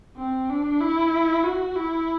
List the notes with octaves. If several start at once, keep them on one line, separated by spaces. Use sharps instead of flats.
C4
D4
E4
F#4
E4